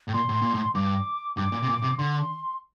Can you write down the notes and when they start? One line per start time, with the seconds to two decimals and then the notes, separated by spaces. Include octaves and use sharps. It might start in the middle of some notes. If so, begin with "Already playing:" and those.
0.08 A2
0.13 A#2 C6
0.29 A2
0.42 A#2
0.54 A2
0.75 G2 D6
1.37 G2 D6
1.52 A#2
1.62 C3
1.68 A#2
1.82 C3
1.98 D3 C6